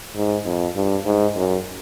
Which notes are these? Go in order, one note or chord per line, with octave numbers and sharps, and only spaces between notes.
G#2
F2
G2
G#2
F#2